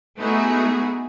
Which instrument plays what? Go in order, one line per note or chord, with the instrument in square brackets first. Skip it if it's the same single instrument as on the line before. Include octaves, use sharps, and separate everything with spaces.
[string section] A3 B3 D#4 E4 F#4 G#4